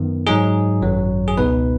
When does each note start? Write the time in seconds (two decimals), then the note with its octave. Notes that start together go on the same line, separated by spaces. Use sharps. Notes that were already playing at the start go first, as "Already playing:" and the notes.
Already playing: F#2 D#3 B3
0.27 G#2 F#3 D#4 G#4
0.82 G#1 F#2 F#3
1.28 G#4
1.37 C#2 B2 B3 D#4 B4